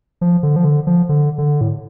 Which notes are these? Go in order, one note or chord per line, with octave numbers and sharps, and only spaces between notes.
F3
D3
F3
D3
F3
D3
D3
A2